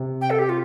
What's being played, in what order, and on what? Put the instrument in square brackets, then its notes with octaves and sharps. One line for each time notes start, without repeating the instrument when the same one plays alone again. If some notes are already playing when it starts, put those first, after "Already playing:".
Already playing: [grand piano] C3
[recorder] G5
A4
G4
F4